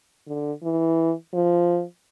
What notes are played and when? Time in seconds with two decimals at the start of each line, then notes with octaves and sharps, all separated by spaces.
0.28 D3
0.63 E3
1.34 F3